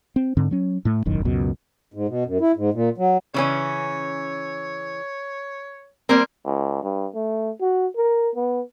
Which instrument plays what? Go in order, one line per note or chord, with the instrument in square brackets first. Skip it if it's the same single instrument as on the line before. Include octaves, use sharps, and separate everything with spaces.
[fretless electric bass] C4
G#2 D3 C4
F#3 C#4
A2 A3
E1 A1 F#2 D#3
C#2 F#2 B2
[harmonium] G#2
B2
F#2
E4
G#2
A#2
F#3
[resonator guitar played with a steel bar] C#3 E3 C#4 [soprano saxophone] C#5
[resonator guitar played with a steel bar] G3 A#3 C4 [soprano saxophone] A#4
[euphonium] C#2
G2
A3
F#4
A#4
B3